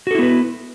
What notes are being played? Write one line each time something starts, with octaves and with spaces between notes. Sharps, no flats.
B3 E4 F#4 A4 B4